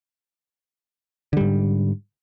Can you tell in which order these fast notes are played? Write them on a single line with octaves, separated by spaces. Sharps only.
D3 G3 G#2